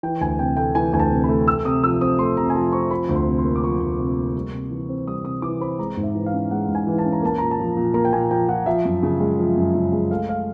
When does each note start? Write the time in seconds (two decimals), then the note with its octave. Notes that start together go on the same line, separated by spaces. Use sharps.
0.03 E3 G5
0.21 D2 G#5
0.39 C3 G5
0.57 A3 G5
0.75 E3 G#5
0.93 D2 G#5
0.99 A5
1.11 C3
1.24 B5
1.29 A3
1.48 A3 E6
1.65 C3 D#6
1.83 F3 E6
2.01 C4 D#6
2.19 A3 C6
2.37 C3 A#5
2.50 G#5
2.55 F3 A5
2.72 C4 C#6
2.90 F3 B5
3.09 D2
3.16 C6
3.27 C3
3.38 C6
3.44 A#3
3.56 D6
3.63 F3 C#6
3.81 D2
3.99 C3
4.17 A#3
4.35 G3
4.52 C3
4.70 E3
4.89 C4
5.07 G3 D#6
5.25 C3 D#6
5.42 E3 D6
5.61 C4 B5
5.79 G#3 A#5
5.97 G#2
6.03 E5
6.15 E3
6.26 F5
6.33 C#4
6.51 G#3 F#5
6.68 G#2
6.75 G#5
6.87 E3
6.98 A5
7.05 C#4
7.12 A#5
7.22 A#3 A5
7.38 A#2 A#5
7.51 A5
7.59 F3
7.77 A#2
7.94 A#3 A#5
8.05 G5
8.13 A#2 G#5
8.31 F3 G5
8.49 A#2 F#5
8.66 F3 E5
8.85 F#2
9.03 C#3
9.20 G#3
9.39 F3
9.57 F#2
9.75 C#3
9.92 G#3
10.10 A3 F5
10.29 F5